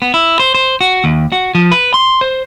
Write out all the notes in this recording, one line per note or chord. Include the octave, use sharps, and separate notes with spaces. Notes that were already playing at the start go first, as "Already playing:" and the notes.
B3
E4
C5
C5
F#4
D#2
F#4
F3
B4
C6
C5